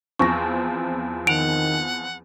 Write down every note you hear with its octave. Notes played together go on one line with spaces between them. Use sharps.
E2 F3 C4 C#6 A#6
D#3 F#5 D7 F7